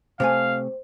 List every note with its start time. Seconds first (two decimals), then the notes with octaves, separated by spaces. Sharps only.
0.20 C3 A3 C5 F5 G#5